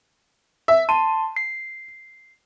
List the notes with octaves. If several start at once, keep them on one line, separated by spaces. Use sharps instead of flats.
E5
A5 C6 D#7
C7